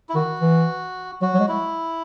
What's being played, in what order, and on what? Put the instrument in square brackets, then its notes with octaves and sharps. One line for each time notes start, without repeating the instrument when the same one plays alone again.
[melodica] E4
[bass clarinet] D#3 [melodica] F#4
[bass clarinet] E3
[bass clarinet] F#3 [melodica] F#4
[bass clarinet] F#3
G#3
[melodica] E4